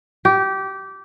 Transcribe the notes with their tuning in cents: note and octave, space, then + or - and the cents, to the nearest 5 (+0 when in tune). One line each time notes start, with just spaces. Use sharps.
G4 -20